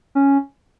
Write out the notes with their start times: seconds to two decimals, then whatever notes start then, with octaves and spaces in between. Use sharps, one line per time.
0.15 C#4